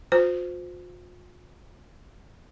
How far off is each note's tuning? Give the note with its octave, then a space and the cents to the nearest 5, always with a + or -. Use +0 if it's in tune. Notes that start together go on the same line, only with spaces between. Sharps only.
F4 +40 C5 -20